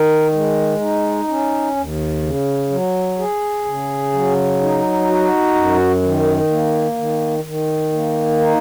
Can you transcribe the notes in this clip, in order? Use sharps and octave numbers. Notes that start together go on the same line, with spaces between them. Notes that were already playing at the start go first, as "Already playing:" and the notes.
Already playing: D#3 A#4
G#3
D#4
C#4
D#2
C#3
F#3
G#4
C#3
F#3
D#4
F#4
F#2
D#3
A#3
D#3
D#3
A#3
D#4